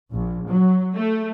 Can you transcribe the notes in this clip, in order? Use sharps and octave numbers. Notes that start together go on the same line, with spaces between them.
A#1
F#3
A3